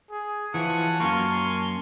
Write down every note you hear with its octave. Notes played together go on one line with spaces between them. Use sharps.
G#4
E3 F3 C#5 F#5 G#5 A5
F#2 A#3 F5 G#5 C6 C#6